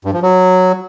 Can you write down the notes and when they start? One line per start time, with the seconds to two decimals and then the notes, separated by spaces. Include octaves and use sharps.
0.05 G2
0.14 F3
0.22 F#3